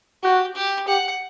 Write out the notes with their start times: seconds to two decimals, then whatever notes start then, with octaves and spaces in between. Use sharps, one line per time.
0.23 F#4 G4
0.55 G4
0.87 G4 F#5